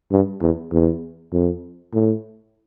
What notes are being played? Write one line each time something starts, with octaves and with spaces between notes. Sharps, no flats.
G2
E2
E2
F2
A2